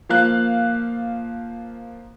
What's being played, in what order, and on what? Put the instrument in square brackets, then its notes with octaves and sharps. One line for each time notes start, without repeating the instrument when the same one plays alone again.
[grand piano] F3 A#3 F5 F#6